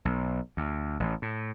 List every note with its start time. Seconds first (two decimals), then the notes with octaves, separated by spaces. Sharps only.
0.05 B1
0.57 D2
1.00 A1
1.22 A2